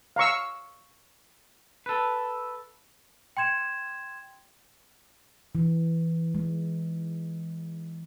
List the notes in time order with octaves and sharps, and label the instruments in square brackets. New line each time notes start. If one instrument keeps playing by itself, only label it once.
[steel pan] F5 A#5 C#6 E6
[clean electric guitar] A4 B4
[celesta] G5 C6 G#6 E7
[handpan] E3
G#3